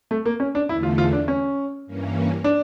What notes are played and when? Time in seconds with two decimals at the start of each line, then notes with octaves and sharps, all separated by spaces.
0.11 A3
0.25 A#3
0.40 C#4
0.55 D4
0.69 E2 D3 A3 E4
0.83 F4
0.98 F4
1.13 D4
1.28 C#4
1.86 G2 E3 A#3 C#4
2.44 D4